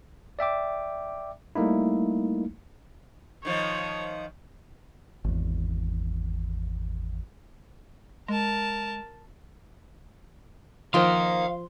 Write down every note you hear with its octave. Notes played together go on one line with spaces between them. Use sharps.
D5 E5 G5 D6
G3 A3 A#3 D#4 E4
D#3 F3 C#5
G#1 E2
G#3 A#4 A5
D#3 F3 A#3 C5 F5 G5 C6